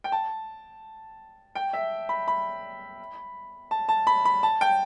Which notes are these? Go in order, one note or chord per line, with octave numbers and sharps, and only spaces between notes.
G5
A5
G5
E5
B5
B5
A5
A5
B5
B5
A5
G5